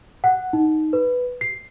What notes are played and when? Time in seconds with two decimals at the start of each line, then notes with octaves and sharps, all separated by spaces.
0.24 F#5
0.53 D#4
0.93 B4
1.41 C7